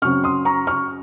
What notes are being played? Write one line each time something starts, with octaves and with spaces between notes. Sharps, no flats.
F#2 C#3 F#3 C4 C#6 F6
C6 D#6
A#5 C#6
C#6 F6